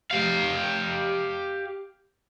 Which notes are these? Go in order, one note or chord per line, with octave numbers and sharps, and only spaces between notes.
G4 F5